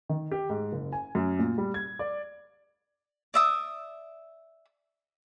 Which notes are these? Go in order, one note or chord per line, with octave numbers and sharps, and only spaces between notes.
D#3
G4
G#2
F#1
G#5
F#2
A#2
G3
G#6
D5
D5 E5 D#6